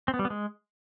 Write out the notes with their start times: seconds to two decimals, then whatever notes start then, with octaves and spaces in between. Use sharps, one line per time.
0.08 C4
0.14 B3
0.19 G3
0.25 B3
0.30 G#3